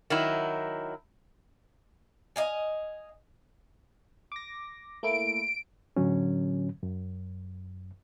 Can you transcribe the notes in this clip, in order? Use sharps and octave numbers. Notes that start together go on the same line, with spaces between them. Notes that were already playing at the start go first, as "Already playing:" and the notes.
D#3 F#3 E4
D#5 F5 G#5
D6 A#6
A3 A#3 E4 D7
A2 D3 F#3 C#4
F#2